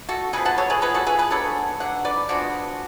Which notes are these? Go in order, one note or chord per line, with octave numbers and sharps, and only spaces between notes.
F#4 A4
G#3 B3 G#4 B4
F3
F#5 A5
A4 C#5
G#4 B4
F3 G#3 B3 G#4 B4
F#4 A4
G#4 B4
G#4 B4
D3 F#3 B3 A4 C#5
D3 F#3 F#5
B4 D5
F3 G#3 B3 D4 F#4